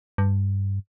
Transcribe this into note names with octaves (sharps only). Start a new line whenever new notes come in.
G2